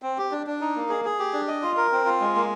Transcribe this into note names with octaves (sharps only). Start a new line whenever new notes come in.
C4
G4
D4
D4
D#4
A#3
G#4
G#4
G4
D4
D#5
F4
A#4
C4
F4
G#3
A#3